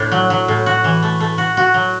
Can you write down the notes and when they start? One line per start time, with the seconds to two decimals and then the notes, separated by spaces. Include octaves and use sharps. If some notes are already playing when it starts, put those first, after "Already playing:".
Already playing: A2 D4
0.12 F#3
0.30 F#3
0.48 A2
0.66 F#4
0.84 E3
1.02 A3
1.20 A3
1.38 F#4
1.57 F#4
1.74 F#3